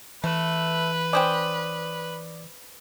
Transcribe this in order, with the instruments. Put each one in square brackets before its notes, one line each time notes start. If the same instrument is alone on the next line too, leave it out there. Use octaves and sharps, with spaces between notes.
[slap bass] E3 [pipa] A3 [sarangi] B4
[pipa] C#4 C5 G5 [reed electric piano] D5 D6 D#6